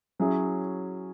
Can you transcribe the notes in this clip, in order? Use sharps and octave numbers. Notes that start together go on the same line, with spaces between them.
F#3 C#4 E4 G#4